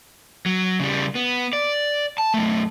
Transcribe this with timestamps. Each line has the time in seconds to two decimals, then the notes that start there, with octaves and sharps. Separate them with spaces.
0.46 F#3
0.80 C#3 G3
1.15 B3
1.53 D5
2.18 A5
2.34 F#2 A3